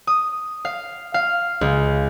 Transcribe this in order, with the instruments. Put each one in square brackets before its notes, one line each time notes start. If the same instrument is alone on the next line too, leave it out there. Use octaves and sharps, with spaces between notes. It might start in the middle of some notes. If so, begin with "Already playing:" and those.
[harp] D#6
F5
F5
C#2